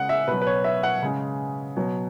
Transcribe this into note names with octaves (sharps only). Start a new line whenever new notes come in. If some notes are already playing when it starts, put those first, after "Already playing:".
Already playing: C#3 G#3 F#5
E5
B2 F#3 B4
B4
C#5
E5
F#5
C#3 G#3
B2 F#3